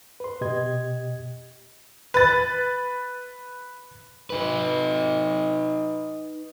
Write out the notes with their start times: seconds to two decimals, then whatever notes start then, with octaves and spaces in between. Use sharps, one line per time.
0.20 B4 C6
0.41 B2 G4 D#5 G#6
2.14 B4 A6
4.30 D#4 B4